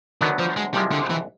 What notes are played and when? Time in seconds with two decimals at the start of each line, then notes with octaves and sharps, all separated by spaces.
0.21 D2 D3 D#3 F#3 B3 D4
0.39 F3
0.57 G#3
0.74 C2 C3 F3 G3 G#3
0.92 D3
1.10 E3